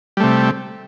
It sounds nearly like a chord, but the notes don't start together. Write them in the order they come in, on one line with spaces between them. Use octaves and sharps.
G3 A3 C3